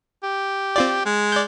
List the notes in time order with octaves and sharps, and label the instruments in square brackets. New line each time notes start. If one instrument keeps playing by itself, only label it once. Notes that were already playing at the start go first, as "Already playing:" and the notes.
[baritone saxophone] G4
[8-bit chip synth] C4 F4 D5
[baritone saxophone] G#3
[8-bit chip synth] D5 G6